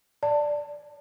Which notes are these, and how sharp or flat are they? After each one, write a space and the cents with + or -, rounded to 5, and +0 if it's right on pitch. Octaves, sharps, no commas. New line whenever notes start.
D5 +0 A5 +20